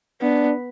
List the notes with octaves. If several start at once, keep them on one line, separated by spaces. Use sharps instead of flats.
B3 D4